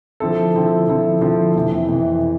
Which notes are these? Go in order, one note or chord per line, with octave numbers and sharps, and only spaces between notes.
D3 F3 C4 E4 A4
D3 F3 C4 E4 A4
D3 F3 C4 E4 A4
D3 F3 C4 E4 A4
F2 C3 E3
F2 C3 E3